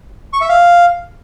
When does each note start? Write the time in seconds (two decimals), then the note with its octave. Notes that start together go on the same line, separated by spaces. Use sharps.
0.33 C#6
0.41 E5
0.49 F5